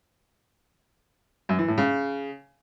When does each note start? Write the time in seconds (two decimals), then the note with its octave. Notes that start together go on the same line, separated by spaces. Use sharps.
1.49 F#2
1.59 E3
1.68 A2
1.78 C#3